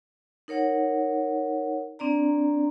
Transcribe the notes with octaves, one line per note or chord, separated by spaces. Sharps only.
D#4 A#4 C#5 F#5
C4 D4 D5 A#5